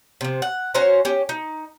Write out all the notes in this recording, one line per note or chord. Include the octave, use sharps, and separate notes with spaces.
C3 F3
F#5
C#4 F#4 C5 A#5
C#4 G4
D#4